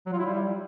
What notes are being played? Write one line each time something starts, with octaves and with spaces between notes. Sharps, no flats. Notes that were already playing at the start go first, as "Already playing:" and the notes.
F#3
F4
E4
G3